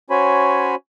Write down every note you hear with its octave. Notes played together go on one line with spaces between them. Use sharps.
C#4 F#4 C5 C#5 G#5 B5